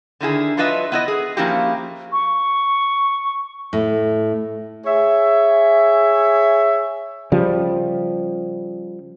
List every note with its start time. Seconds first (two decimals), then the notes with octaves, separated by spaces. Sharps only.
0.20 D3 D#3 E4 G#4
0.57 F#3 D4 F4 B4 D#5 E5
0.92 B3 E4 D#5
1.08 G#4
1.37 F3 A#3 C#4 E4 F#4 G4
2.12 C#6
3.73 A2
4.86 G#4 C#5 E5
7.32 C#3 F3 G3